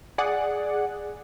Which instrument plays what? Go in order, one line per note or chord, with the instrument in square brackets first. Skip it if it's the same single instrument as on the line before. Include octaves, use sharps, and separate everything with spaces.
[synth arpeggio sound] G#4 D5 F#5